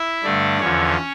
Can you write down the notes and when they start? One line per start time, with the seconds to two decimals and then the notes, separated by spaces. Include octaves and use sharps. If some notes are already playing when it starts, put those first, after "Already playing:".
Already playing: E4 E5
0.23 G2 D3 A3 D4 D5
0.60 E2 D3 F3 C#4 C#5